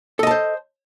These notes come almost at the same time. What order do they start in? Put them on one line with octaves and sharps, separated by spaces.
A4 D#5 A5 C5